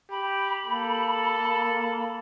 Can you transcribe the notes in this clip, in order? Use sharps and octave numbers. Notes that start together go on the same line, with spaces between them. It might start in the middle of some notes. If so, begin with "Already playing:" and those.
G4 B5
A#3 A4